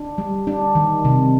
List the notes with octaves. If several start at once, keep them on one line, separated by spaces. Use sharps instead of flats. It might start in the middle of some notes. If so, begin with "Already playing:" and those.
Already playing: D4
G3
D4
D#3
C3